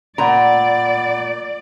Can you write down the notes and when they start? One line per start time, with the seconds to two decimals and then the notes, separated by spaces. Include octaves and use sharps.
0.18 A#2 D5 F#5 A#5 B5